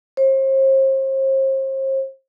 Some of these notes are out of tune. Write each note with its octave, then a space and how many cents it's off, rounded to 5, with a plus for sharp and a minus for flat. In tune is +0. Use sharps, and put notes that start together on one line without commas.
C5 +40